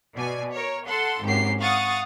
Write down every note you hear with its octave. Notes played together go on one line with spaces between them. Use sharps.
B2 D5 G#5
A#4 C#5
A4 F#5 C6
G#1 F#2 G4 C7
F5 F#5 C#6 D#6 A6